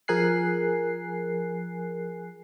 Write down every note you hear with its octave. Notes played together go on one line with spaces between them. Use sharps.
F3 G#4 A#4 G#5 F#6 C7